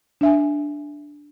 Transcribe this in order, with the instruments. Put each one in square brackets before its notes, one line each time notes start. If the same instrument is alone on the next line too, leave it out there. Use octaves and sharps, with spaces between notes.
[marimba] D4 E5 G#5